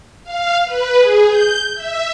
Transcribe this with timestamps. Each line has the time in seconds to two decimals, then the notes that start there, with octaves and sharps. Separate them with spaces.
0.23 F5
0.65 B4
0.98 G#4
1.27 G6
1.75 E5